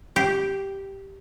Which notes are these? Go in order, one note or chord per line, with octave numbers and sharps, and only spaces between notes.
G4